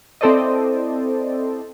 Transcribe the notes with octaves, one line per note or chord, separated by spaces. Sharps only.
C4 E4 A4 C5 D5 D#5